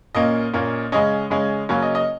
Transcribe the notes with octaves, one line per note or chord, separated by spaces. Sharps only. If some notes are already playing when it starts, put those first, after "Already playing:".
A#2 A#3 C#4 D#5
A#2 A#3 C#4
C#3 G#3 C#4 D#5
C#3 G#3 C#4
C#3 F#3 A#3 C#4
D#5
D#5